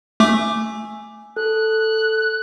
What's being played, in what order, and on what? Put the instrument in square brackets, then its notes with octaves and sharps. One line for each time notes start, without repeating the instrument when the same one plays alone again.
[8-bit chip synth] A3 D6 [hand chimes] G#5 E6
[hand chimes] A4 [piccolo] F#6